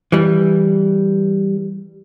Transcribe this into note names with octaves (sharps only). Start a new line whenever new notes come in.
E3 G3